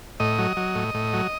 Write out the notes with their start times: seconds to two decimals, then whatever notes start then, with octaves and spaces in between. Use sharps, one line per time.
0.20 A2 D#5
0.39 F#3
0.57 F#3
0.75 A2
0.94 A2
1.13 F#3